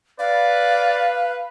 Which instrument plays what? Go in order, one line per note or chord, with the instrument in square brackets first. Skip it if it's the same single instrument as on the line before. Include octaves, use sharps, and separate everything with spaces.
[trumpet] B4 [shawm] D5 [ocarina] F5